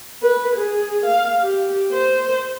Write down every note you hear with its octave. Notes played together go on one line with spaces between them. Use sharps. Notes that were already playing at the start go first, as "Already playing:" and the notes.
B4
G#4
F5
G4
C5